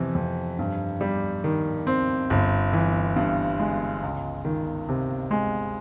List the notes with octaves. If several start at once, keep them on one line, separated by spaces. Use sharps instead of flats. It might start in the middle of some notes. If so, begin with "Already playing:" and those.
Already playing: F2 C3 E3
F2
G2
G3
D#3
C4
G1
E3
G2
G#3
C#2
D#3
C3
G#3